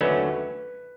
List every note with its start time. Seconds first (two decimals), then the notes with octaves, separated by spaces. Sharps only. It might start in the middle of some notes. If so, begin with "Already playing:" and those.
0.01 D#2 D3 F#3 A3 C#4 B4